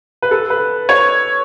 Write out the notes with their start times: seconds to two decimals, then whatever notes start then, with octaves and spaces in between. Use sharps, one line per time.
0.22 B4
0.31 A4
0.50 B4
0.89 C#5